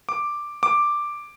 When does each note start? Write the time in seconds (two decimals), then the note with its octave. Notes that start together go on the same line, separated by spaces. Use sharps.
0.09 D6
0.63 D6